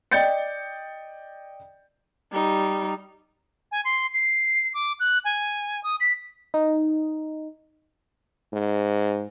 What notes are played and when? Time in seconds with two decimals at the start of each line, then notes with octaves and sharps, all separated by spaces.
0.12 D5 D#5 G5 G6 A6 C#7
2.32 G3 D#4
3.72 G#5
3.85 C6
4.14 C7
4.74 D6
5.00 F#6
5.25 G#5
5.83 D#6
6.01 B6
6.54 D#4
8.53 G#2